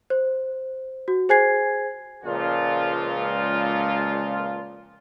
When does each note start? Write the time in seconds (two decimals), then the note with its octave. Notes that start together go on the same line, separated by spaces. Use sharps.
0.10 C5
1.08 F#4
1.29 G#4 C5 G#5 G#6 C7
2.24 C#2 A#2 F3 F4